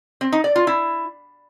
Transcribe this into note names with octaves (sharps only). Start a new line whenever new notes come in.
C4
D#4
D5
F4
E4